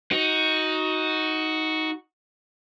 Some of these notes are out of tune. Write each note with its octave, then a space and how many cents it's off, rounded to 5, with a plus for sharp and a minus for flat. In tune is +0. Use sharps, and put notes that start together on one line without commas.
D#4 +15 F#4 +0